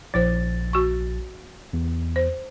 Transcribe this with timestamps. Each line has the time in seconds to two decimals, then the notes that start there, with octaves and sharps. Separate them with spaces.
0.14 A#1 F3 E4 C5 A6
0.73 F#4 C#6
1.73 E2
2.16 C5